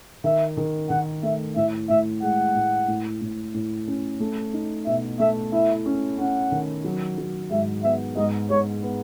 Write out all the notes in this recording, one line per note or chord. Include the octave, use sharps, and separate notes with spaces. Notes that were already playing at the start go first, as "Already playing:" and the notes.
D#3 E5
D#3
D#3 F#5
A3 E5
A2 E5
A2 E5
G#3 F#5
A2
A2
A2
A2
C#4
A3
D#4
B2 E5
A3 E5
E4 E5
C#4
C#4 F#5
D#3
F#3
F#3
G#2 E5
B3 E5
G#2 D#5
G#2 C#5
B3